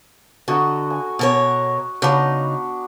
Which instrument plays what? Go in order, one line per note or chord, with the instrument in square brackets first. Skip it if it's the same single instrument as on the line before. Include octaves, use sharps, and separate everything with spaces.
[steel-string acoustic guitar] D3 [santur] F#4 D#5 A#5
[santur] G#5
[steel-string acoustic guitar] B2 A#4 C#5
[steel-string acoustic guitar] C#3 D#4 [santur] B3 D4 F#4